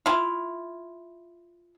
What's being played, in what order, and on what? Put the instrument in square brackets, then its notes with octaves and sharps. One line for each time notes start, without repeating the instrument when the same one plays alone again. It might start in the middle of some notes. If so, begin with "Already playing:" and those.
[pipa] E4 F4